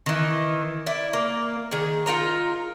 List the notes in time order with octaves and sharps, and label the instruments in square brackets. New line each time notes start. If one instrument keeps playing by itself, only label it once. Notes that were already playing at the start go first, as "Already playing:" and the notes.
[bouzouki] D#3 E3
E4 D5
A#3
D#3 G#4
D#4 F4 A#4 A#5